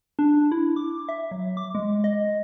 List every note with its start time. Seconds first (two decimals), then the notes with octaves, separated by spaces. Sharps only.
0.19 D4
0.52 E4
0.76 D6
1.09 E5
1.31 F#3
1.57 D6
1.75 G#3
2.04 D#5